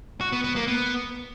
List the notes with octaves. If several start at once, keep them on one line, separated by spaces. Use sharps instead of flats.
F#4
B3
B3
A#3
B3